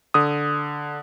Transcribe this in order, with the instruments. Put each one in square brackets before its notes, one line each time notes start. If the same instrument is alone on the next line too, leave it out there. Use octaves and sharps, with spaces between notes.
[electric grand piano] D3 D#6